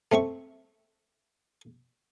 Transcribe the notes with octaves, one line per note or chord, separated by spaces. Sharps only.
A3 C4 E5 C#6